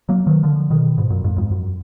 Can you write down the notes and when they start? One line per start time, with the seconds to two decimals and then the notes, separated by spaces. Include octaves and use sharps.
0.09 F#3 A#3
0.27 D#3 F#3
0.43 D3 F3
0.70 B2 D#3
0.98 G#2 B2
1.10 F#2 A#2
1.24 F2 G#2
1.37 F2 G#2
1.51 F#2